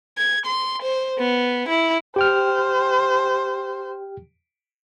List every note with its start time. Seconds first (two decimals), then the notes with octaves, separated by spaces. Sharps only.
0.18 G#6
0.46 C6
0.83 C5
1.18 B3
1.69 E4
2.16 G4 C5 G5 F6